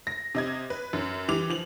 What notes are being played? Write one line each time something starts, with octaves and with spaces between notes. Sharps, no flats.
A#6
C3 D#5 G#6
B4
F#2
E3 G3 D6 F7
F3 F7 F#7